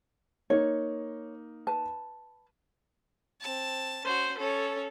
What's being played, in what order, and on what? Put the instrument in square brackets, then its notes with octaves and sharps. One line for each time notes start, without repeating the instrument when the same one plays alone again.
[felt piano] A#3 D#4 [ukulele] C#5
[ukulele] B4 A5
[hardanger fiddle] C4 A5
[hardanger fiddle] C#4 F#4 [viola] C5
[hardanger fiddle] C#4 C#5 [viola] A4